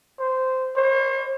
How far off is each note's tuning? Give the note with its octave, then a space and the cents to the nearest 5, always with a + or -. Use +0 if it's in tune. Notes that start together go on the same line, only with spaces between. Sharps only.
C5 -10
C5 +45